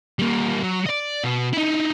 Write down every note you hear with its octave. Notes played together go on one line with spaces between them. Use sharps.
G3 A#3
F#3
D5 D#5
B2
D#4 E4